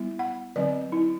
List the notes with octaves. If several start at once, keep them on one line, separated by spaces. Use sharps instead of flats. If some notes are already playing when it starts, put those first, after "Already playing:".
Already playing: G3 B3 E4
F#5
D3 F#3 C4 D5
E4